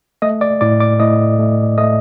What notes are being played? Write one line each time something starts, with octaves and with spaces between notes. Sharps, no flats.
A3 D#5 D#6
D5 D6
A2 D5 D6
D5 D6
A2 D#5 D#6
A3
A3 D#5 D#6